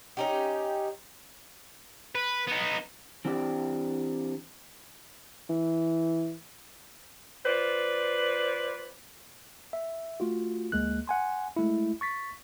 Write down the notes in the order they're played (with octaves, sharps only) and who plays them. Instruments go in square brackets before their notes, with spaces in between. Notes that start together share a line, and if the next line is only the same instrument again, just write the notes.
[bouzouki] C#4 D#4 G4
[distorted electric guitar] B4
B3 D#4
[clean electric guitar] E3 C4 D4 G4 D5
[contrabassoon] E3
[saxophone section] F4 B4 C5 D5
[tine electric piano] E5
A3 F4 F#4
D2 G#3 A#3 F#6
F#5 G#5 C6
G#3 A3 E4
C#6 A6 B6